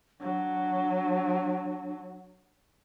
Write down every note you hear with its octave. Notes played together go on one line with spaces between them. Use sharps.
F#3 D4